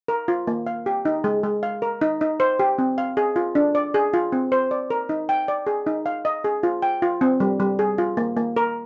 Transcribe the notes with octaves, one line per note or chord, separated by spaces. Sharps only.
A#4
F4
A#3
F5
G4
D#4
G#3
G#3
F5
A#4
D#4
D#4
C5
G4
C4
F5
G#4
F4
D4
D5
G#4
F4
C4
C5
D5
A#4
D#4
G5
D5
G#4
D#4
F5
D#5
G#4
F4
G5
F4
C4
G3
G3
G#4
F4
A#3
A#3
A#4